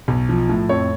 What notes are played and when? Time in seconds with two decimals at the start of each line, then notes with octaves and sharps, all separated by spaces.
0.08 B1
0.29 F3
0.49 A2
0.69 F2 C#5